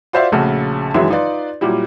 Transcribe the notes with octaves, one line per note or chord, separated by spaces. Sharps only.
F4 F#4 C5 D5 E5 F5
A#1 C#3 A3 F#4
F#2 D#3 E3 F#3 G#3 E5
D#4 F4 B4 D5
A#2 F#3 G3 E4